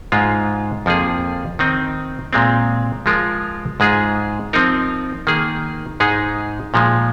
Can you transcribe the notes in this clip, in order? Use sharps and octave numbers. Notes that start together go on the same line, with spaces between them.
G#2 G#3 F4
F2 F3 A#3 G#4
D#3 C4 D#4
A#2 G#3 C4
F3 G#3 F4 A#4
G#2 G#3 F4 G#4
F3 C4 D#4 A#4
D#3 A#3 G#4
G#2 G#3 D#4 G#4
A#2 F3 G#3